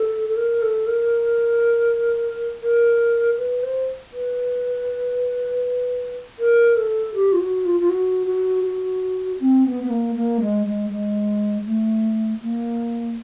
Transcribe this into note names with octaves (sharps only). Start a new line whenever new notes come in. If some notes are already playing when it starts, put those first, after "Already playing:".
Already playing: A4
A4
A#4
A4
A#4
A#4
B4
C5
B4
A#4
A4
G4
F4
F#4
F4
F4
F#4
F#4
F#4
C4
B3
B3
A#3
A#3
G#3
G#3
G#3
A3
A#3